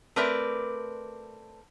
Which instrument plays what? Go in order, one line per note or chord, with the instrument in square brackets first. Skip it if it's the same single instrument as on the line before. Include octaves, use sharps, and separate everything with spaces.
[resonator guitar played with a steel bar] A3 C4 A#4 B4 D5